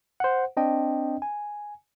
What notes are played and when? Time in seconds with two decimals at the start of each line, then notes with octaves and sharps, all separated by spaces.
0.20 C5 F#5
0.57 C4 D4 D#5 G5
1.22 G#5